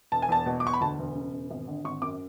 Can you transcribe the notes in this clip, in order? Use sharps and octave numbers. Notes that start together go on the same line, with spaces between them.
E1 A5
G#5
E2 A5
B2
D6
E2 C#6
B5
D2 A5
E1
C#3
E1
G#1
D3
G#1 C#6
F#2 D6